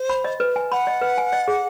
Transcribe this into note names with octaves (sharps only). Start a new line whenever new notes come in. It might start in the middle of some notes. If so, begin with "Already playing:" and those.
Already playing: C5
B5
D#5
B4
G#5
F#5 B5
D#5
B4
G#5
D#5
G#4